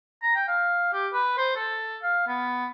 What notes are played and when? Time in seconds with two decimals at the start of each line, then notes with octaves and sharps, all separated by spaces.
0.22 A#5
0.35 G5
0.48 F5
0.93 G4
1.13 B4
1.38 C5
1.56 A4
2.02 F5
2.27 B3